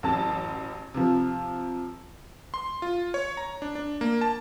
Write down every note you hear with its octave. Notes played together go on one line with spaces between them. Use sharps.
A1 F#2 A5
C3 F3
C6
F4
C#5
A#5
D4
D4
A#3
A5